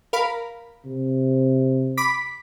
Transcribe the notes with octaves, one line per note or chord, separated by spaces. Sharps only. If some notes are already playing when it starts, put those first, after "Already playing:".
A#4 F5 B5
C3
B5 D6 B6